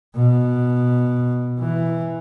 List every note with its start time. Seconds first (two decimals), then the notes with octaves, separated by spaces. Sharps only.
0.15 B2
1.60 E3